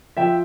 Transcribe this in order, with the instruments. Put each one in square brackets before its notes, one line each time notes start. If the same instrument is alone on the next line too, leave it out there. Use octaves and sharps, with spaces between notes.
[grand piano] F3 E5 G5